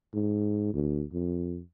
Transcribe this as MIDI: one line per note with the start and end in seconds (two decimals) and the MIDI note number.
0.14 0.72 44
0.74 1.04 38
1.12 1.61 41